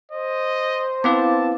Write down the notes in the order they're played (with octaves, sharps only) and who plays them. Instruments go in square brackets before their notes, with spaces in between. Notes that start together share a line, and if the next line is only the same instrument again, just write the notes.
[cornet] C5 [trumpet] D#5
[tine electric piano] B3 C4 B4 [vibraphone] E4 F5 D6 [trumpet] A5